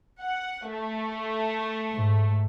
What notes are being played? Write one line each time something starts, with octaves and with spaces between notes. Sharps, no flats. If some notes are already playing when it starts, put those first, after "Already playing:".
F#5
A3
G#2